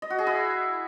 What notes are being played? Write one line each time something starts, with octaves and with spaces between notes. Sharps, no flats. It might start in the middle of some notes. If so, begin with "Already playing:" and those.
D#5
F#4
G#4
E4